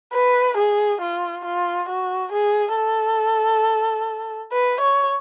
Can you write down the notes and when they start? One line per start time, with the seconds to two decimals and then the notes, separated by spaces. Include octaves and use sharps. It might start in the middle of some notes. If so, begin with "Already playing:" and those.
0.13 B4
0.57 G#4
1.01 F4
1.45 F4
1.88 F#4
2.32 G#4
2.76 A4
4.52 B4
4.81 C#5